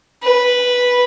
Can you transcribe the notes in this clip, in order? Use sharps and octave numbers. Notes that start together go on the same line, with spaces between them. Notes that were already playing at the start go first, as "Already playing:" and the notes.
B4